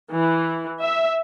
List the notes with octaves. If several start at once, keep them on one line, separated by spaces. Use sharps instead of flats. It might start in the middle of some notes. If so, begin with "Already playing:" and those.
E3
E5